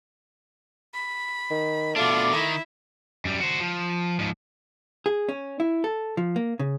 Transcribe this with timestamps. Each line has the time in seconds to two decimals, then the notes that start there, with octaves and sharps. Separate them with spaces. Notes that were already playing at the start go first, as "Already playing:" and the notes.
0.94 B5
1.50 D#3
1.96 B2 A3 D4 F4 D6
2.33 D#3 E4
3.25 F#2 G3
3.41 F#4 C5
3.60 F3
4.19 G#2 F3
5.06 G#4
5.29 C#4
5.60 E4
5.84 A4
6.17 F3
6.36 A#3
6.59 C#3